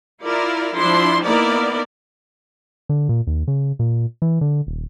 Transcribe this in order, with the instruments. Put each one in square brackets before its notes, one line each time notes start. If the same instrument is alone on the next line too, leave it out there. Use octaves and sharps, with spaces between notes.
[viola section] E4 F4 A#4 D5
F3 D4 E4 C6
A#3 B3 D#4 E4 A#4 D5
[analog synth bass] D3
A#2
D#2
C#3
A#2
E3
D3
D#1